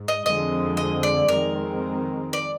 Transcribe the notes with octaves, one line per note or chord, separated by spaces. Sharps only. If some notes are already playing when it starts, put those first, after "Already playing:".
Already playing: G#2
D#5
F2 D3 F3 G#3 C4 D#5
D#5
D5
F2 D#3 G#3 C4 A#4
D5